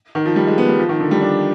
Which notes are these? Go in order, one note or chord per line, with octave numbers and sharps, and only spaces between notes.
D#3
F3
G3
G#3
B3
G3
F3
D#3
D3
G3
D4